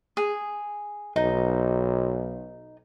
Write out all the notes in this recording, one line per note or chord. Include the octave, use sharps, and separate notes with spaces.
G#4
B1 D#4